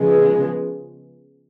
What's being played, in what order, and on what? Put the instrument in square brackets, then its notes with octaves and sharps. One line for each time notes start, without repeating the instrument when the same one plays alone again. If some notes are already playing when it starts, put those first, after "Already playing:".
Already playing: [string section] C#3 F3 G#3 B3